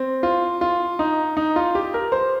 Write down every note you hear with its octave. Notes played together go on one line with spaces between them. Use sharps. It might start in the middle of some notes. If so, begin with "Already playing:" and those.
Already playing: C4
F4
F4
D#4
D#4
F4
G4
A#4
C5